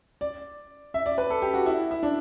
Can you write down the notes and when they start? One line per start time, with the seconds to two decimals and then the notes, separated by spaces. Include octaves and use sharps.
0.21 D5
0.94 E5
1.06 D5
1.18 B4
1.30 A4
1.42 G4
1.54 F#4
1.66 E4
1.91 E4
2.03 D4